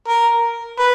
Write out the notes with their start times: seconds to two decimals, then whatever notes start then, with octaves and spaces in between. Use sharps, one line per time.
0.08 A#4
0.79 B4